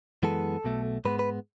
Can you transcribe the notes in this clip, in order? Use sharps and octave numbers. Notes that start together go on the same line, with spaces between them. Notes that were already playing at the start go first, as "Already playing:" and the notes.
F#2 E3 G#3 B3 A4
B1 B2 A3
G#2 G#3 B3 B4
B4